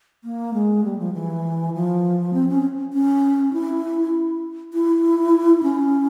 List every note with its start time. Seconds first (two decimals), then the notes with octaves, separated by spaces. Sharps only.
0.24 A#3
0.54 G#3
0.84 G3
0.99 F3
1.14 E3
1.74 F3
2.33 C4
2.49 C#4
2.93 C#4
3.53 E4
4.74 E4
5.63 C#4